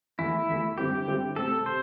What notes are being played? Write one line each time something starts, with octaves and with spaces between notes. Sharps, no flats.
E2 E3 A3 E4
E2 E3 A3
G2 D3 C4 E4 G4
G2 D3 C4 E4
C3 A3 C4 A4
C3 C5